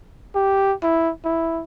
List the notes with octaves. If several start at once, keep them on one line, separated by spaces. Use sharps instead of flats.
G4
E4
E4